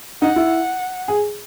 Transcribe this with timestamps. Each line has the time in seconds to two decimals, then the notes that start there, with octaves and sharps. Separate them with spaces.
0.22 D#4 F#5
0.36 E4
1.08 G#4